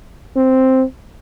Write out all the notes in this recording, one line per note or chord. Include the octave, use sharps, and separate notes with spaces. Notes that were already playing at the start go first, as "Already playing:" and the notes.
C4